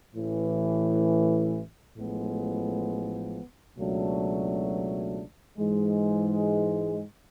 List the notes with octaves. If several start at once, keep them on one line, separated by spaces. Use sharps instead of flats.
A1 A2 E3
A1 A2 F3 G#3 B3
C#2 B2 F#3 A3 D4
G#2 E3 G#3